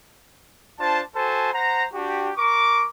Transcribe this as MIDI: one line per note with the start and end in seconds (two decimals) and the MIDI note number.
0.80 1.02 62
0.80 1.02 65
0.80 1.02 72
0.80 1.02 81
1.16 1.52 66
1.16 1.52 69
1.16 1.52 72
1.16 1.52 80
1.16 1.52 81
1.54 1.86 72
1.54 1.86 78
1.54 1.86 82
1.94 2.31 62
1.94 2.31 66
1.94 2.31 67
2.37 2.86 70
2.37 2.86 85
2.37 2.86 86